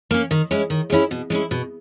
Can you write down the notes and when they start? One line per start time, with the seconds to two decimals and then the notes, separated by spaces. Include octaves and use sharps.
0.11 A#3 C#4
0.31 D#3
0.51 G#3 C#4 E4
0.70 D#3
0.90 G#3 C#4 E4
1.11 B2
1.30 G#3 C#4 E4
1.51 B2